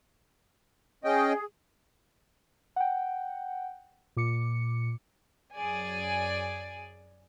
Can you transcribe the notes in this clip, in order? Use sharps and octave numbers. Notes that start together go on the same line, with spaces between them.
C#4 G#4 D#5 G5
F#5 G5
A#2 D6 C#7
F#2 G#4 D5 G#5